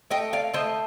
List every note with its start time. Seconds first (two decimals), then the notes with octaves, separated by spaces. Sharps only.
0.10 A3 D#5 G5
0.33 D5 F5
0.54 A3 C5 D#5